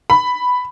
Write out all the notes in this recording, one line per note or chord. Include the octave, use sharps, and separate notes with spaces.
B5